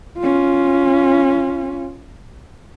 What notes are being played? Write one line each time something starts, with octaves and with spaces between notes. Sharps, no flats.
C#4 F4